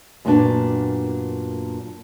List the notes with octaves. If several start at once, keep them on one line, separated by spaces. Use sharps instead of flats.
F#2 A#2 A#3 B3 D4